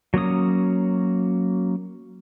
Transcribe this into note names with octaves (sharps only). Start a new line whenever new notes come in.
F#3 A#3 C#4 D#6